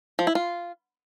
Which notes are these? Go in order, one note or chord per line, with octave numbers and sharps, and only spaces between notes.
F3
E4
F4